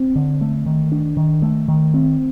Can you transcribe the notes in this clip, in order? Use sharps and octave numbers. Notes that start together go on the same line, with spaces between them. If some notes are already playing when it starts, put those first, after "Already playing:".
Already playing: C4
D3
A3
D#3
D4
D#3
A3
D#3
C4